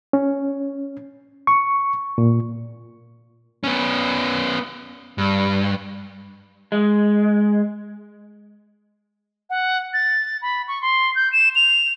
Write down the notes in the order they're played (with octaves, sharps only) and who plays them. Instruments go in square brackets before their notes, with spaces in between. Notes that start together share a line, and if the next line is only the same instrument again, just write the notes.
[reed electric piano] C#4
C#6
A#2
[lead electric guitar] B3 C#4
G2
[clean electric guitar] G#3
[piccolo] F#5
A6
B5
C#6
C6
G6
E7
F7